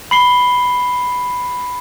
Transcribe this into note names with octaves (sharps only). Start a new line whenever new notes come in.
B5 C7 G7